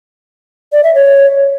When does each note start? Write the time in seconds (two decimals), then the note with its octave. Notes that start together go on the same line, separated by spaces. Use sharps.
0.72 D5
0.84 E5
0.95 C#5